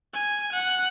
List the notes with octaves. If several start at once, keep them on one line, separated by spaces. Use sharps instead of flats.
G#5
F#5